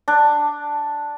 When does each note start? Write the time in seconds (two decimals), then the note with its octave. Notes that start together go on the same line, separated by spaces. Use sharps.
0.08 D4